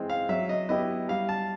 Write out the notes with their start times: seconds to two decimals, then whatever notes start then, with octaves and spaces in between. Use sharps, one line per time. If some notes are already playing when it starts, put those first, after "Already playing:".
Already playing: E3 G#3 C4
0.10 F5
0.29 F#3 E5
0.49 D#5
0.69 B3 E4 G4 D#5
1.08 G3 F5
1.29 A5